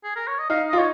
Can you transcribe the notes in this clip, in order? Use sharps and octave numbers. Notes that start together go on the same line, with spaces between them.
G#4
A#4
C#5
D#5
D#4 F5
F4 D#5
D#4 C#5